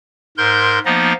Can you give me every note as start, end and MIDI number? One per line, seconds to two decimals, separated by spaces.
0.38 0.79 44
0.38 0.79 70
0.38 0.79 84
0.38 0.79 91
0.85 1.13 53
0.85 1.13 58
0.85 1.13 59
0.85 1.13 63
0.85 1.13 75